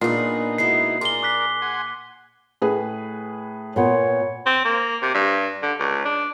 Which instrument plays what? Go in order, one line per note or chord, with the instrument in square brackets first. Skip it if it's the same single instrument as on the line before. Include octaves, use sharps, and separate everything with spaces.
[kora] A#2 [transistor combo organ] B3 D#4 [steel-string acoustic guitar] D4 G#4 [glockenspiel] C7
[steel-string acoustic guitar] G#3 E4 F#4 [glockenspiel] C7
[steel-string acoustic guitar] G#4 [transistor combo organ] A#4 D5 [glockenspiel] C6 G7
[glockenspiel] D6 F#6 B6
[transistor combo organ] F#5 G#5 C6
[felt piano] A2 G#4 B4
[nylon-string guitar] A#2 B3 [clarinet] C#5
[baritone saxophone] C4
A#3
C3
G2
D3
C#2
D4